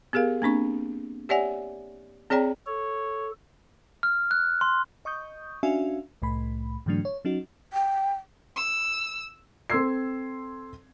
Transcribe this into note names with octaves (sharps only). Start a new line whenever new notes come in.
B3 G4 G#4 A#4 F5
A#3 C4 D4 C#6
G4 C#5 D5 E5 F#5 G#5
C4 G#4 C#5 D5 G5 A#5
A4 C#5
F6
F#6
C6
D#5 C#6 D#6 G6
C#4 D4 F#4 E5 F5 G#5
C2 A2 A3 B5
G#2 D3 E3 F#3 A3 D4
C#5
F#3 C#4 D#4 F#4
G5
E6
C4 A4 C6 E6 G#6 C7